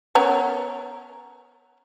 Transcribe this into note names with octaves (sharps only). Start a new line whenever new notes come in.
B3 C#4 A#4